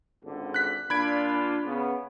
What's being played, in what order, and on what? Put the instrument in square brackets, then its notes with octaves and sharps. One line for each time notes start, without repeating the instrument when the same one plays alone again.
[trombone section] G#1 C#2 D3
[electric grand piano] F#6 B6
[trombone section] A#2 D4 F4 [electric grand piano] B5 G#6 D7
[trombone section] C#3 B3